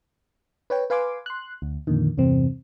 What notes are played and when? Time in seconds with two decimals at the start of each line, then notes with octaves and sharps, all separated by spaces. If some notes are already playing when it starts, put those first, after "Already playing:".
0.70 B4 C#5 G5
0.90 B4 F5 G#5 C6 D6
1.26 C6 F#6
1.62 D2
1.87 F2 A#2 D3 D#3
2.18 E2 G2 C3 C4